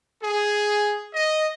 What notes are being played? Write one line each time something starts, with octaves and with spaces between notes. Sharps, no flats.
G#4
D#5